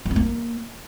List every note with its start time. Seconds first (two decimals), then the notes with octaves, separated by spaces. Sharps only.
0.05 F3
0.11 C#4
0.16 A#3